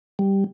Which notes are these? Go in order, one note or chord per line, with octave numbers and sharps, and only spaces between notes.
G3